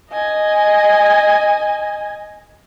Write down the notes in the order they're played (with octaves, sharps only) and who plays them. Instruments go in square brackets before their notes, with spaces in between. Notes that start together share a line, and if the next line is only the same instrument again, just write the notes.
[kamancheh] D#5 G#5